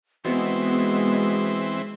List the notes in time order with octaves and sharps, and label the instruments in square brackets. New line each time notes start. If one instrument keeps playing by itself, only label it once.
[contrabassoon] B2 [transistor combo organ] E3 C4 [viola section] G#3 [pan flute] B3